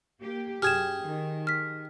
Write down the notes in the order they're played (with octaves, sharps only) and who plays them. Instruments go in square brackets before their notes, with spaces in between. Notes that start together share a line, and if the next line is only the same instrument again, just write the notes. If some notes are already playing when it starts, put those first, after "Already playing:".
[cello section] A#3 G4
[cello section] F#2 [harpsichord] G4 G#4 G5 [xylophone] F6 G#6 E7
[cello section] D#3
[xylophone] F6 B6